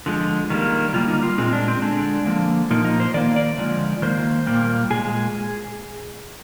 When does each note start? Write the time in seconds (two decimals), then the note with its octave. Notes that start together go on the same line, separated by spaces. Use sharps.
0.06 D3 F3 G#3
0.50 D#3 G3 A#3
0.94 D3 G3 A#3 F4
1.08 D#4
1.23 F4
1.38 A#2 G#3 C4
1.53 D4
1.68 C4
1.82 D3 G#3 D4
2.26 D3 F3 A#3
2.70 A#2 F3 A#3 D#4
2.85 D#4
3.00 C5
3.14 D#3 A#3 D5
3.36 D5
3.58 D3 F3 G#3
4.02 D#3 A#3 C5
4.46 A#2 G3 A#3
4.90 A#2 G#3 G#4